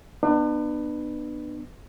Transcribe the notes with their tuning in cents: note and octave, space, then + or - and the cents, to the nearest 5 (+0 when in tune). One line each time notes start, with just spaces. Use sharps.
B3 +0 D4 +40 B4 +0